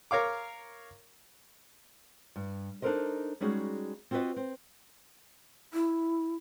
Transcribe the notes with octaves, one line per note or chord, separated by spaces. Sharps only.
A#4 C#5 F5 D6
G2
D4 D#4 A4 A#4 C5 D#5
G3 G#3 C#4 D#4 F#4 G#4
C4 F4 F#4 A#4 B4 D#5
C4
E4